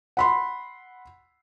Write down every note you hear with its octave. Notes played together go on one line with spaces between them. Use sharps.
F#5 B5 C6